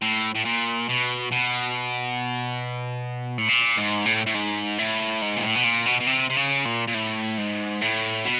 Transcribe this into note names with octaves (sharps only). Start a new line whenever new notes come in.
A2
A2
A#2
B2
B2
A2
A#2
G#2
A2
A2
G#2
A2
G#2
A#2
A2
B2
A#2
B2
B2
C3
C3
C#3
A#2
A#2
A2
G#2
A2
B2